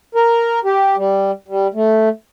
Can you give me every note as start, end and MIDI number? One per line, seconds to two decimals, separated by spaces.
0.15 0.59 70
0.64 0.96 67
0.96 1.31 55
1.48 1.67 55
1.74 2.09 57